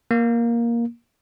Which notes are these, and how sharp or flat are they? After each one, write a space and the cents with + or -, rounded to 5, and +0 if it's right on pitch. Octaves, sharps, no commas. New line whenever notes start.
A#3 +10